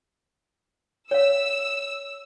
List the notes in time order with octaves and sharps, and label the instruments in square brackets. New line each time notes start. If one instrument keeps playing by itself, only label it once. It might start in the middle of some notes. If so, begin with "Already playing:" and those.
[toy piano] C#5 F5 [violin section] E6